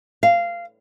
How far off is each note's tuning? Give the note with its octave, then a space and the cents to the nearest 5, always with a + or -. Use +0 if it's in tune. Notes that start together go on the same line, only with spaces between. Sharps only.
F5 -15